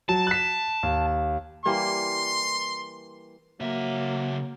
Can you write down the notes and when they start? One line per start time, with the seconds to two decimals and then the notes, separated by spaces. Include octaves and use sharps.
0.09 F#3 A5
0.27 F#6 B6
0.83 D#2
1.66 E3 G3 A#3 C6
3.61 C#3 F#3 A#3 E5